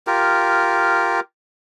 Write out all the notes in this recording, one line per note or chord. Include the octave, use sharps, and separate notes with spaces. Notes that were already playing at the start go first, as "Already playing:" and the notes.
F4 G4 A#4